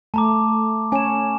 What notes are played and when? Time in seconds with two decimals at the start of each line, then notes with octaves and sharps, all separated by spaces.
0.14 A3 A5 A#5 D6
0.92 C#4 C#5 G#5 E7